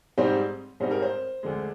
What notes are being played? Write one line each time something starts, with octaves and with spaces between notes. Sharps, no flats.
G#2 G3 C4 D#4 C5
G#2 G3 C4 D#4 C5
A#4
C5
D2 D3 G#3